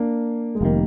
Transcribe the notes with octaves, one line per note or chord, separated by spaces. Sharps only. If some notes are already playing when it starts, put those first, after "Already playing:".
Already playing: A#3 D4
G#3
F1 D#3 G3 A#3